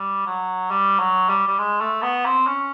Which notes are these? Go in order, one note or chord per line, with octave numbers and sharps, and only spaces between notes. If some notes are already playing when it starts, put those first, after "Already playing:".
Already playing: G3
F#3
G3
F#3
G3
G3
G#3
A3
B3
C4
C#4